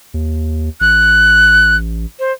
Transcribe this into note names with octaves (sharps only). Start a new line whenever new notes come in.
D#2
A1 F#6
C5